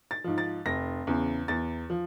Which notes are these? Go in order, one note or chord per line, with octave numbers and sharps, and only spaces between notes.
A6
G#2 F3
A6
F1 A#6
E2 C#3
E2 A6
F3